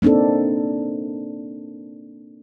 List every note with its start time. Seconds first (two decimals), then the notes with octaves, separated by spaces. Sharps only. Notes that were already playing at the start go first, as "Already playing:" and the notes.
0.02 A#3 C4 D4 D#4 A4